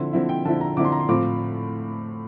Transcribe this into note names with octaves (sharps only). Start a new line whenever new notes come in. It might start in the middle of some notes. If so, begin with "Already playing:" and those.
Already playing: D3 F3 C4 E4 C6
D3 F3 C4 E4
G5
D3 F3 C4 E4 A5
A#5
D3 F3 C4 E4 D6
C6
A#5
C6
A2 F3 C4 F4 D6